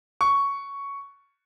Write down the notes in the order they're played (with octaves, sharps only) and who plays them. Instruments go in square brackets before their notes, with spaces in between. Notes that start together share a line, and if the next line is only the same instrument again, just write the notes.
[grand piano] C#6